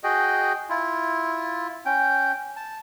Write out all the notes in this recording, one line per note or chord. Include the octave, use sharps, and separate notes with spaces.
F#4 G#4 D#5 G5
E4 F4
C#4 G5
A5